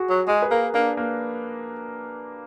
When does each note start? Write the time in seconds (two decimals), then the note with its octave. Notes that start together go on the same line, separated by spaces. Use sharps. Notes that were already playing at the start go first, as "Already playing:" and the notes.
Already playing: F#4 G#4
0.10 F#3
0.28 G#3 G#4
0.42 B4
0.51 A#3 A#4
0.74 A#3 D4
0.97 A#3